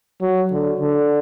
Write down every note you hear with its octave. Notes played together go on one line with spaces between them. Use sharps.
F#3
D3
D3